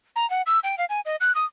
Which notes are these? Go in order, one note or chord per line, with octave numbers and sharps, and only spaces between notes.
A#5
F#5
E6
G5
F5
G#5
D#5
F#6
D#6